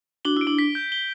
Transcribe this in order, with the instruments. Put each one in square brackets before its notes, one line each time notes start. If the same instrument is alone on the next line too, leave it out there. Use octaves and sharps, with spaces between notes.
[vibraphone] D4 F#4 [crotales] G7
[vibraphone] E4 [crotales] D7
[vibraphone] D4
[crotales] B6
G6
G7